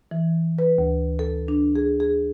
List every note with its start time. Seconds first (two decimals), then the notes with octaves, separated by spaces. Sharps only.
0.11 E3
0.58 B4
0.78 D2
1.19 A4
1.48 D4
1.76 G#4
2.00 G#4